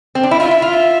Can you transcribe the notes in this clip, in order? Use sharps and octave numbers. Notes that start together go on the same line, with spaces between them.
C4
D4
E4
F4 E5
E4
F4 F5
E5